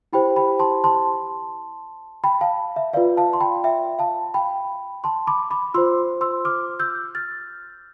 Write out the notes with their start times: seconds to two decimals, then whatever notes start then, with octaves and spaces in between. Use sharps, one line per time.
0.13 E4 G4 C5 G5 B5
0.36 G5 B5
0.59 A5 C6
0.84 A5 C6
2.24 G5 B5
2.41 F5 A5
2.76 E5
2.93 F4 B4 D5 F5
3.17 F5 A5
3.33 C6
3.41 G5 B5
3.64 E5 G5
3.99 F5 A5
4.34 G5 B5
5.04 A5 C6
5.27 B5 D6
5.51 B5 D6
5.74 F4 C5 C6 E6
6.21 C6 E6
6.45 D6 F6
6.80 E6 G6
7.15 F6 A6